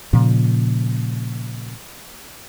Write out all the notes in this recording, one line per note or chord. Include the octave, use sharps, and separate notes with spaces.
A#2 C#3 F3